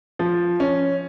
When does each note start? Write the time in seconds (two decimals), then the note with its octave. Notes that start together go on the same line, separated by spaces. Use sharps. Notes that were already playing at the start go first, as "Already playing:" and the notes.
0.19 F3
0.60 C#4